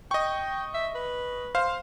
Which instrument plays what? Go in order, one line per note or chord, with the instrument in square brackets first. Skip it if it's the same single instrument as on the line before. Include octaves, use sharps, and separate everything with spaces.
[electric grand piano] D#5 C#6 [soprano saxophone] G5
[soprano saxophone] E5
B4
[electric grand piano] C5 F5